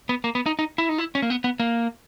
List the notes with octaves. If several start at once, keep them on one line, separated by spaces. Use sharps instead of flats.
B3
A#3
B3
D#4
D#4
E4
D#4
E4
C#4
A#3
B3
B3
A#3